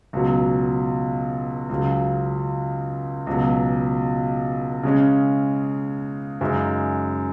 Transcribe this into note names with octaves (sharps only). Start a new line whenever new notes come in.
C#2 B2 F#3
C#2 C#3 F#3
C#2 B2 F#3
C#3 G#3 C#4
F#2 C#3 G#3 D#4